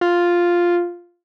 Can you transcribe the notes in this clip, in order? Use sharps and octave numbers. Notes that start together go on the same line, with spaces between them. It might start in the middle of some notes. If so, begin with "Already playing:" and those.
F4